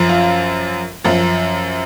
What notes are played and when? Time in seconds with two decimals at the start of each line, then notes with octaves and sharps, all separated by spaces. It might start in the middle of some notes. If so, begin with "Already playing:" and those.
Already playing: F#2 F3
0.09 F4
1.05 F#2 F3